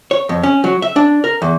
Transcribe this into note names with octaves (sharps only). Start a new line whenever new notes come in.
C#5
F2
C#4
F#3
E5
D4
A#4
E2